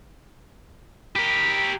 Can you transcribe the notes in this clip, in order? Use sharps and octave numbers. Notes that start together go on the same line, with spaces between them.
G4 A#4 B5